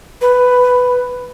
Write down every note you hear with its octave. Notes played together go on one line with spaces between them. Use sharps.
B4